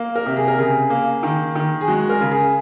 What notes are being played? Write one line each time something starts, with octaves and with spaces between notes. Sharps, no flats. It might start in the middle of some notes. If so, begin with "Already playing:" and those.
Already playing: A#3
A#4
C3
G#4
A#4
C#3 G#4
A#3
D#3
D#3
G#4
G#3 F#4
A#4
C#3
G#4